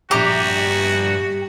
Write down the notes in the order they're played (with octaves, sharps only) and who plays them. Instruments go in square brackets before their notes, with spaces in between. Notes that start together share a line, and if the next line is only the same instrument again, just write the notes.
[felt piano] A#1 E5 D6 [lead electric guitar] G2 A#5 [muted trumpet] F#4 [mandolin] G4